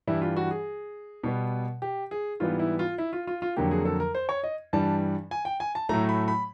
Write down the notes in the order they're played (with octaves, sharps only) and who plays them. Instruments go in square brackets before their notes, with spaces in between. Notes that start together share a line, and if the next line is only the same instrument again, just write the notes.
[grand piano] G2 E3 G3 E4
F4
F#4
G#4
B2 G3 B3
G4
G#4
G#2 E3 G3 B3 F4
E4
F4
E4
F4
F4
F4
F2 D3 F#3 A#3 G4
G#4
A4
A#4
C5
C#5
D#5
G2 E3 G3 A5
G#5
G5
G#5
A5
A2 F#3 A3 A#5
B5
B5